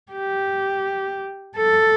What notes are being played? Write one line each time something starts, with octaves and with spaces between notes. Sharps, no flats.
G4
A4